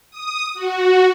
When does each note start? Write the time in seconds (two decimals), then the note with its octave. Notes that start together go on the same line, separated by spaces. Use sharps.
0.10 D#6
0.54 F#4